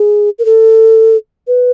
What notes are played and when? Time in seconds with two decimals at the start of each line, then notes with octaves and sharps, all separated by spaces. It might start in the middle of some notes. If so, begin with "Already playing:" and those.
Already playing: G#4
0.39 A#4
0.45 A4
1.47 B4